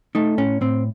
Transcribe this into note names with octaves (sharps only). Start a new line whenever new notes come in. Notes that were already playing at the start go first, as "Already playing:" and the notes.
A3 D#4
A2 C#4
A2 C4